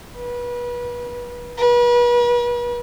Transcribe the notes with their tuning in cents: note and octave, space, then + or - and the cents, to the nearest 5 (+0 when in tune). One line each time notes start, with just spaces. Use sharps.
B4 -30
B4 -40